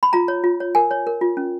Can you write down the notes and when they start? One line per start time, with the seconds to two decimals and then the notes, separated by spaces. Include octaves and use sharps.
0.03 B5
0.13 F4 A#5
0.28 C#5
0.44 F4
0.60 C#5
0.75 A#4 G#5
0.91 C#5
1.07 A#4
1.21 F4
1.37 C#4